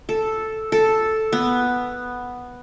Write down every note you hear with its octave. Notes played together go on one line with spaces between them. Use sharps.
A4
A4
B3